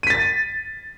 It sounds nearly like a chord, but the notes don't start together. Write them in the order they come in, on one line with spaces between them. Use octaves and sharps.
D#7 B6 A6